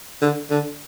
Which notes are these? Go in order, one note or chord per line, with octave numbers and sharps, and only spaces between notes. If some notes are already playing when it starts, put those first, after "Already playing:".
D3
D3